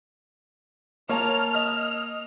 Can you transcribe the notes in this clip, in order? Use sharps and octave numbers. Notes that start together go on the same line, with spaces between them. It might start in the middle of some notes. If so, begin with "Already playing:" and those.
A#3 C#5 A5 A#5 F6
D#5